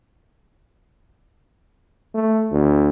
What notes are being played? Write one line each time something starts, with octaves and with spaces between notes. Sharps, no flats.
A3
D2